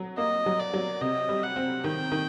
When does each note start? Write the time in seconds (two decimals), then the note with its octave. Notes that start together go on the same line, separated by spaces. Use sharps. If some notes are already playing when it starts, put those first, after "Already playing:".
Already playing: F#3
0.18 A#3 D#5
0.46 F#3
0.60 D5
0.74 F#3
1.01 C3 D#5
1.29 G3
1.43 F#5
1.56 C4
1.84 D#3 G5
2.12 D#3